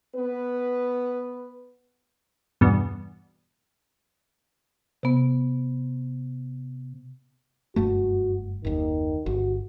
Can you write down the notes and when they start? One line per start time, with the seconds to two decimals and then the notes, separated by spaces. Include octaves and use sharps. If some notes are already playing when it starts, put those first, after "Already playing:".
0.15 B3 B4
2.61 E2 G2 B2
5.03 C3 B3
7.76 F#1 G2 A3 F#4
8.65 F#1 D#2 D#3
9.26 G1 F#4